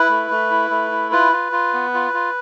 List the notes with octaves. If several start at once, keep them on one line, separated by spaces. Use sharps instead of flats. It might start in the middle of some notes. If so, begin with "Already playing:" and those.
Already playing: E4 B4
A3
A3
E4
A3
E4
F4 B4
F4
F4
B3
F4
F4